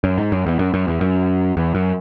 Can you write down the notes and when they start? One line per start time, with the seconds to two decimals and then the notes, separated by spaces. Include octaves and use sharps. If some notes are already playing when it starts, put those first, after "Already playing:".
0.04 F#2
0.18 G#2
0.32 F#2
0.46 E2
0.59 F#2
0.74 F#2
0.88 E2
1.01 F#2
1.57 E2
1.75 F#2